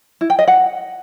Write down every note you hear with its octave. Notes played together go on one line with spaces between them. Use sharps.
E4
G5
D#5
F#5